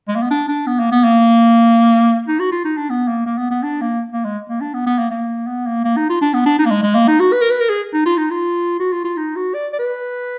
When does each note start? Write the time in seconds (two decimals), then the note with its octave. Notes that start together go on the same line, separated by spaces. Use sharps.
0.08 G#3
0.16 A#3
0.23 B3
0.30 D4
0.49 D4
0.67 B3
0.80 A#3
0.92 B3
1.04 A#3
2.28 D#4
2.40 F#4
2.52 F4
2.65 D#4
2.77 D4
2.90 B3
3.08 A#3
3.26 A#3
3.38 B3
3.51 B3
3.63 D4
3.82 A#3
4.12 A#3
4.25 G#3
4.50 A#3
4.61 D4
4.74 B3
4.86 B3
4.99 A#3
5.11 A#3
5.47 B3
5.67 A#3
5.85 A#3
5.97 D#4
6.09 F4
6.21 D4
6.34 B3
6.46 D4
6.59 D#4
6.66 A#3
6.71 G#3
6.83 G#3
6.95 A#3
7.08 D#4
7.20 F#4
7.33 B4
7.42 A#4
7.51 B4
7.60 A#4
7.69 G#4
7.94 D#4
8.06 F4
8.18 D#4
8.31 F4
8.80 F#4
8.92 F4
9.05 F4
9.17 D#4
9.36 F#4
9.54 D5
9.73 D5
9.79 B4